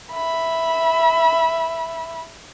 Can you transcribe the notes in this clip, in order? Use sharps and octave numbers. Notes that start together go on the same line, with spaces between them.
E5 B5